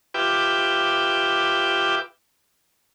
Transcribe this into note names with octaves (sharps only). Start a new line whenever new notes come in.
F4 G4 B4 E5 G5 D6